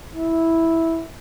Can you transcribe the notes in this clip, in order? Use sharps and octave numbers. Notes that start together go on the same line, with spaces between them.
E4